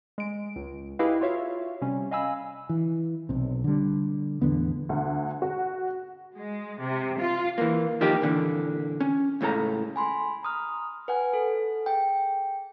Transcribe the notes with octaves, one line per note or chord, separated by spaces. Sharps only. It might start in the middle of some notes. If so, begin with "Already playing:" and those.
G#3 D7
C#2
E4 G4 G#4 B4 D#5 F5
F4 F#4 C#5 E5 F5
C3 G3 C#4
D#5 F5 G#5 B5 E6
E3
B1 C3
D3 G3
A1 E2 D3 B3
D2
F#4
G#3
C3
F4
E3 A#3
D#3 F3 A#3 D#4 G4
A#2 D3 E3
C#4
C#2 A2 C#3 A4 A#5
G#5 B5 C6
A#5 D#6 F6
B4 F#5 G#5
A4
G#4 G5